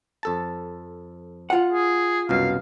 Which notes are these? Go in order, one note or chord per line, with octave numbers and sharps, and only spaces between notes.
F2 A4 A5
F4 F#5
G#4
C2 F#2 B2 F5